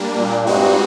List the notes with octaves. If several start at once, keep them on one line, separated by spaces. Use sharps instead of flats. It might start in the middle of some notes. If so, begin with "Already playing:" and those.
Already playing: G3 A#3 D4
A#2
G2 G#3 C4 D#4 F#4